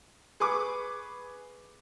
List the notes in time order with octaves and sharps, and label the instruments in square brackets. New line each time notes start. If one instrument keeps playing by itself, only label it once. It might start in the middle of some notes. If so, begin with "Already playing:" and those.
[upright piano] G#4 B4 C#6 D6